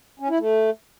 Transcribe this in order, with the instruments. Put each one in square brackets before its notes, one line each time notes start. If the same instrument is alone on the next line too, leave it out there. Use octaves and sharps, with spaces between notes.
[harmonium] C#4
E4
A3